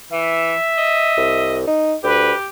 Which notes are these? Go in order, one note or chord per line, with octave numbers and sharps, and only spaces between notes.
E3 E5
D#5
C2
D#4
D2 G4 B4